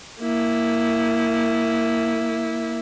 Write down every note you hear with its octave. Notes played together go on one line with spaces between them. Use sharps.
A#3 E4